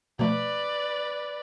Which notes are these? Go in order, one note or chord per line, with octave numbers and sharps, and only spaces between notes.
B2 F3 A3 B4 D5